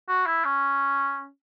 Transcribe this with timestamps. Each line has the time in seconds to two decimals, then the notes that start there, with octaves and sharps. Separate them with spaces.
0.08 F#4
0.26 E4
0.45 C#4